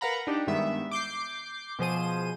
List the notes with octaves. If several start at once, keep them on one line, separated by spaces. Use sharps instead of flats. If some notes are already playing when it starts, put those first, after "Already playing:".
A#4 B4 F5 F#5 A#5 B5
D4 D#4 G4
G2 D#3 G#3 B3 E5
D6 G6 C7
B2 F3 G#4 C5 D#7